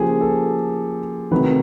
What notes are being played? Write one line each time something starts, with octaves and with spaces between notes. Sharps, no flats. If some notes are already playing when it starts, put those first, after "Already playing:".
Already playing: C#3 F3 A#3 G4 G#4
A4
C3 D#3 F#3 A3 B4